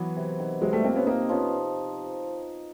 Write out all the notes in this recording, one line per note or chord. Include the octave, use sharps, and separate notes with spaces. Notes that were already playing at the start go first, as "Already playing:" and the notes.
Already playing: E3 F#3 B3 F#4
C3
D#3
C3 F#3 G#3
G3 A3
F3 A#3 C4
B3 C#4
A#3 C4 D#4
F3 B3 C#4